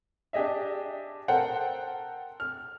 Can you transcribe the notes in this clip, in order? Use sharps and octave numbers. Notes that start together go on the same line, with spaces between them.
D4 G4 G#4 D#5 E5
A4 A#4 C5 F#5 G5
F6